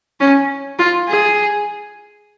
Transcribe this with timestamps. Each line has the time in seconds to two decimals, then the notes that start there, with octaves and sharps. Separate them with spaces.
0.20 C#4
0.79 F4
1.08 G#4